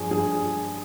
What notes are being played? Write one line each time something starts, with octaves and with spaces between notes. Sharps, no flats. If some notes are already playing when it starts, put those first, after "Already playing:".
Already playing: G2 F3 G#4
G2 G#4